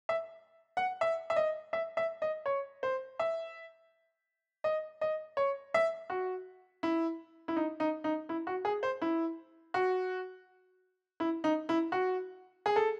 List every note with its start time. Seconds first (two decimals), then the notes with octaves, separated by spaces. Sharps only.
0.09 E5
0.77 F#5
1.01 E5
1.30 E5
1.36 D#5
1.73 E5
1.97 E5
2.22 D#5
2.46 C#5
2.83 C5
3.20 E5
4.64 D#5
5.01 D#5
5.37 C#5
5.74 E5
6.10 F#4
6.83 E4
7.48 E4
7.56 D#4
7.80 D#4
8.04 D#4
8.29 E4
8.47 F#4
8.65 G#4
8.83 C5
9.02 E4
9.74 F#4
11.20 E4
11.44 D#4
11.69 E4
11.92 F#4
12.66 G#4
12.76 A4